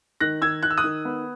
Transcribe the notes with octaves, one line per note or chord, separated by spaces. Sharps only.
D#3 F#6 A#6
D#3 E6 G#6
D#3 F#6
E6
D#6 F#6
D#3
B3